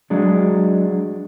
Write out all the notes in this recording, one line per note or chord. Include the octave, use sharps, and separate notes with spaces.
F#3 G#3 D4